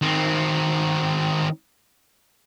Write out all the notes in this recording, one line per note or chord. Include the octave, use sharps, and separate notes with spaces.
D#3 C4